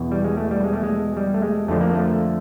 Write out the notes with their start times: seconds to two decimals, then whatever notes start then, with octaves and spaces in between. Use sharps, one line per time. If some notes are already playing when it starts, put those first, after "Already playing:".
Already playing: E2 B2
0.12 G3
0.24 G#3
0.37 A3
0.51 G3
0.64 G#3
0.73 A3
0.83 G#3
1.17 G3
1.34 A3
1.42 G#3
1.68 F2 D3 F3 A3
1.81 A#3
1.95 A3